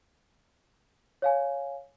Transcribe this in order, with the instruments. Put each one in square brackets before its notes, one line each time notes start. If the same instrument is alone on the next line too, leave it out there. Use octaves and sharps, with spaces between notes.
[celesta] C#5 F5 G#5